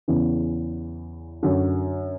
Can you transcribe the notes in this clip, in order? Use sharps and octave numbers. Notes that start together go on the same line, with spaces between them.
E2 C#3 E3
F#2 D3 F#3